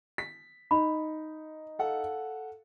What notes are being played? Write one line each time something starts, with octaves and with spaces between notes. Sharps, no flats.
B6
D#4 B5
A4 F5 F#5